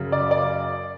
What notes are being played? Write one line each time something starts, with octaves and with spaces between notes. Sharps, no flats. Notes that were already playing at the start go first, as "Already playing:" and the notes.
Already playing: F#2 C#3 F#3
D5
D5